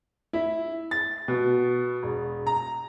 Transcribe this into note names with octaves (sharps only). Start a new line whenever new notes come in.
E4
A6
B2
E1
A#5